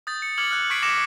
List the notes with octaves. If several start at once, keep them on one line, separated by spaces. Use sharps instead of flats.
D#6 G6 A6
C#7
D6 F6 G#6 C#7 F#7
F6 F#6
C#6 G#6 B6 C7 D7
D6 F6 G#6 A#6 C#7 E7